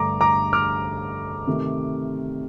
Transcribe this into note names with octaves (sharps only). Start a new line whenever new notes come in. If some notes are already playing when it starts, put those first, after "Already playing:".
Already playing: G2 D3 A3 A#5 D6
A#5 D6
D6 F6
C3 D#3 A3